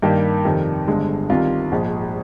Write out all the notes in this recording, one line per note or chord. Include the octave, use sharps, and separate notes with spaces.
G2 D#3 G3 A#3 G4
F2 C3 D#3
G1 G2 D3 G#3
C2 C3 D#3 F4
A#1 G#2 F3 G#3